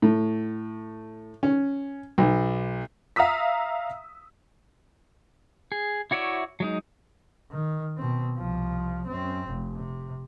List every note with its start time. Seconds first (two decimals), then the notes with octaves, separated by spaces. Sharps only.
0.02 A2
1.43 C#4
2.18 B1
3.16 E5 F5 A#5 D#6 E6 B6
5.72 G#4
6.11 E4 F#4 C#5 D5 E5
6.60 F#3 G#3 D#4
7.51 D#3
7.97 B2 C4
8.38 C2 F3
9.07 F#2 C4
9.47 F1
9.77 C3